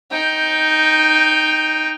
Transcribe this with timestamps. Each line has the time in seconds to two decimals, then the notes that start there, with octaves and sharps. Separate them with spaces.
0.12 D#4 G5